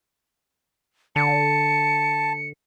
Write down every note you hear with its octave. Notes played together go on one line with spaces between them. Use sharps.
D3 A5 C#7